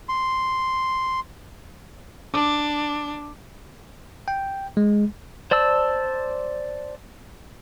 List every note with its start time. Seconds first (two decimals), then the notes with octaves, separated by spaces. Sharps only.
0.09 C6
2.34 D4 D6
4.28 G5
4.77 G#3
5.51 C5 D5 A5 E6